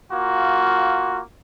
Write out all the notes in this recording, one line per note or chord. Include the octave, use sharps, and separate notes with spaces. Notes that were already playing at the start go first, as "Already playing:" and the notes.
A#3 F4 F#4